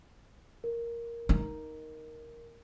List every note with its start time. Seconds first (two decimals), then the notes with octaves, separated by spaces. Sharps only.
0.64 A#4
1.29 D#4